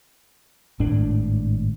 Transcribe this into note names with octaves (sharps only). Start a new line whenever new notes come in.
G#1 A2 D4